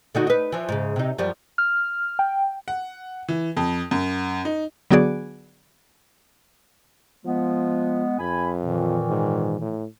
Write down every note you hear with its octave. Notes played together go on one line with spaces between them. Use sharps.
D3 D#4 F#4
D#4 B4
E3 F3
G#2 C#3
C3 D#4
F#2 F3 G3
F6
G5
F#5
E3
F2
F#2
D#4
D3 F#3 B3 F#4 G#4 D5
F3 G#3 B3
F2 G#5 B5
A#2 D#3 E3
G#2
A2